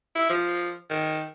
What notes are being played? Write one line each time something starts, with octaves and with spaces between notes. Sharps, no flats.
E4
F3
D#3